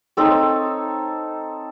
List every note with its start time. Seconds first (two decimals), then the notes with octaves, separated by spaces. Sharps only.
0.17 C4 D#4 A4 C#5